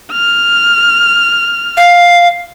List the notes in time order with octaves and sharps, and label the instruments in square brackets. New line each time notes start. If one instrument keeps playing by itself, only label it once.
[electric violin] F6
[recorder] F5